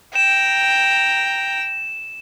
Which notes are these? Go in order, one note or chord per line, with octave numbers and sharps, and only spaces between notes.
G5 A#5 E7